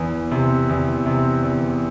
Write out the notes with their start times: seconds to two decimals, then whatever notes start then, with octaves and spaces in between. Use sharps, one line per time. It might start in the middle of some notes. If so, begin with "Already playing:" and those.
Already playing: E2
0.31 C3
0.69 E2
1.06 C3
1.43 E2